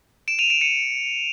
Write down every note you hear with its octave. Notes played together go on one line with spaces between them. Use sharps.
D7 E7
D#7 F7
D7 E7
C#7 D#7